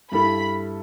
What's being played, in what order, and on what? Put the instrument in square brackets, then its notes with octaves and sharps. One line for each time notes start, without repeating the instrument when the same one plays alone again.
[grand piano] G2 G3 E4 A4 [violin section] B5